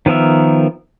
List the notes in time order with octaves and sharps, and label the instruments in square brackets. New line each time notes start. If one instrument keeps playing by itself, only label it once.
[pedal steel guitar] D#3 F3 B3 A#4 E5